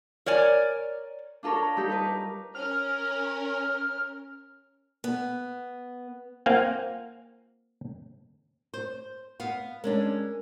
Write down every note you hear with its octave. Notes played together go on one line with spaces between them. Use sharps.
A#4 C#5 D5 G#5
D4 F4 A4 A#4 C#5
A#5
G3 D#4 G4 A4
D#4 A#4 B4
C#4 A#4 F6
B3
A#3 C4 F4 F5 F#5 G#5
C5
B3 F5
G#3 C#4 D4 A#4